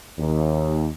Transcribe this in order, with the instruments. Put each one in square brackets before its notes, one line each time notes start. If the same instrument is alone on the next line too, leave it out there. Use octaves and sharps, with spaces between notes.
[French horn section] D#2